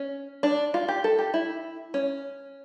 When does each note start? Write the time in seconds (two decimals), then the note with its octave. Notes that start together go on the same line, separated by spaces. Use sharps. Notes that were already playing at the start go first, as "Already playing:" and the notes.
Already playing: C#4
0.43 D4
0.74 F4
0.88 G4
1.04 A4
1.18 G4
1.34 E4
1.94 C#4